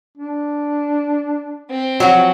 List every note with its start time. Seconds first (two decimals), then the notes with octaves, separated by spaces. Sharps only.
0.17 D4
1.70 C4
2.00 F3 F#3 F#4